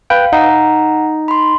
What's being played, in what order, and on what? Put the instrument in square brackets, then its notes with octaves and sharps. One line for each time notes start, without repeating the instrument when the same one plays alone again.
[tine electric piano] B4 G5 [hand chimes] F5
[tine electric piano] D#4 [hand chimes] F#5 A#5
[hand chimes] B5 C6